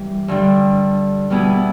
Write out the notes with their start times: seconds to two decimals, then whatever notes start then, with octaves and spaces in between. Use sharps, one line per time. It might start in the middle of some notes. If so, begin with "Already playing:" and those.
Already playing: E3 G3
0.28 G2 D3 G3
1.30 B2 G3 B3 E4 G#4